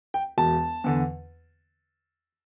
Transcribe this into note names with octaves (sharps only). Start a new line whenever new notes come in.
G5
E1 A5
E2 D3